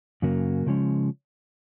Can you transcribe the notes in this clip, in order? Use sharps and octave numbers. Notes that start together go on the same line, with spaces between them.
F#2 C#3 F#3 A#3
C#3 F3 G#3 C#4